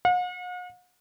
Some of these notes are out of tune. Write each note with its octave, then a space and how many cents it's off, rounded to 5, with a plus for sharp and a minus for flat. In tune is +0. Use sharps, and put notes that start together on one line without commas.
F#5 -45